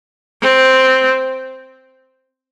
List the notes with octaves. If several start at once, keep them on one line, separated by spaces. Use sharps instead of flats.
C4